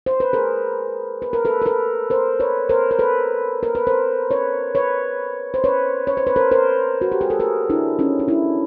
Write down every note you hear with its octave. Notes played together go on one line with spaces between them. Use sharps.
C5
B4
G#4 A#4
B4
A#4
A4 B4
A#4
A4 B4
A#4 C5
B4 C#5
A#4 C5
A#4
A4 B4
A#4
B4
A#4 C5
B4 C#5
B4 C#5
C5
B4 C#5
C#5
C5
B4
A#4 C5
A#4 C5
F#4
G4
G#4
A4
G#4 A#4
D4 E4
C#4 D#4
D#4
D4 E4